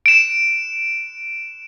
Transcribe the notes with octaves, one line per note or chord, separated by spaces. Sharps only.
D7 E7